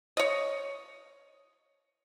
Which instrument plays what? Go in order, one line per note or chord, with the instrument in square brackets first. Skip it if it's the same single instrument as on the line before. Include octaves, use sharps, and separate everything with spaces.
[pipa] C#5 D#5